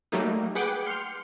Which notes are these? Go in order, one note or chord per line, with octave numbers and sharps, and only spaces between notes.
F#3 G3 A3 A#3 D#4
G#4 B4 F#5 G5 D6
C6 F6 G6 C7 C#7